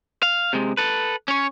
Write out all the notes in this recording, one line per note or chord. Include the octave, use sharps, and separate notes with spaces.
F5
C3 G#3
A4 B4
C#4 C#5